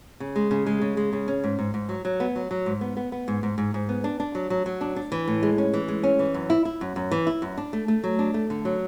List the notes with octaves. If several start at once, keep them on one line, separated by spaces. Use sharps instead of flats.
C#3
G#3
C#3
G#3
C#3
G#3
C#3
C#4
G#2
G#2
G#2
F#3
F#3
B3
F#3
F#3
G#2
B3
B3
B3
G#2
G#2
G#2
G#2
B3
D4
D4
F#3
F#3
F#3
D4
D4
E3
A2
G#3
C#4
E3
G#3
C#4
E3
F#2
E4
E4
F#2
F#2
E3
E4
F#2
D4
A3
A3
F#3
D4
A3
D3
F#3